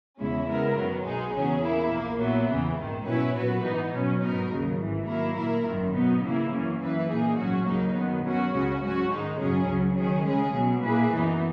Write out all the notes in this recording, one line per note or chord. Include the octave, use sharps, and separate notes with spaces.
E2 C#3 G#3 C#4 E4
C#3 G#3 B3 E4 A#4
F#2 D#3 F#3 B3
B1 B2 G#3 D#4 G#4
E2 C#3 F#3 C#4 G#4
A#2 A#3 E4
A#1 A#2 A#3
A#2 F#3 B3 E4
E2 C#3 E3
A#1 G#2 D#3
B2 F#3 C#4 E4 B4
A#2 F#3 B3 F#4 B4
G#2 E3 B3 D#4
B2 F#3 C#4
G#2 F#3 B3 D#4 A#4
D#2 C#3 F#3
G#1 G#2 E3
D#3 F#3 A#3 E4 A#4
A#2 A#3 E4 A#4
G#1 F#2 D#3
B2 F#3 B3 D#4
C#3 E3 A#3 E4
F#2 E3 A#3 C#4
F#2 E3 A#3 E4 B4
A#2 A#3 D#4 G#4
A#1 G#2 F#3 C#4 F#4
D#2 C#3 F#3 A#3 D#4
F#2 D#3 F#3 B3
B2 F#3 C#4 F#4
C#2 C#3 G#3 C#4 F#4
G#2 F#3 C#4 F#4
G#2 D#3 G#3 D#4
F#2 C#3 F#3 C#4 G#4
C#2 C#3 F#3
D#3 F#3 C#4 G#4
C#3 G#3 C#4 G#4
B1 B2 F#3
A#2 A#3 E4 G#4 B4
F#2 E3 B3 D#4